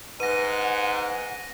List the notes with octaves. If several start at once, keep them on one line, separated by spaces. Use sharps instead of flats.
G#2 B4 F#5 A#6 D#7